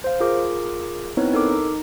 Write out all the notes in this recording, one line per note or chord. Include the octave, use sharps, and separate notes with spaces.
C5 F5
F4 G#4 A#4 D6
B3 C4 D#4 E4 B4 C#5
D#4 A4 A#4 D6
D#4